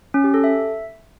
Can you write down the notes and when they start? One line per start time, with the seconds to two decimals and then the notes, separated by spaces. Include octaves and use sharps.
0.14 C#4
0.24 G4
0.34 A4
0.44 E5